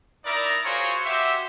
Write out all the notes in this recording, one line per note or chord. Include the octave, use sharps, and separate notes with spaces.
D#4 E4 A#4 D5 E5 A#5
F4 F#4 G#4 A#4 C5 C#5
F#4 G4 C5 E5